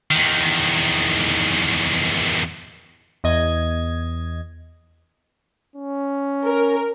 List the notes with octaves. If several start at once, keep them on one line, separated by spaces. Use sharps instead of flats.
E2 D#3
E2 D#5 G#6
C#4
A#4